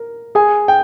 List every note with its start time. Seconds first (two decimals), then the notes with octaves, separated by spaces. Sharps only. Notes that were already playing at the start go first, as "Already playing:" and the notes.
Already playing: A#4
0.35 G#4 G#5
0.68 G5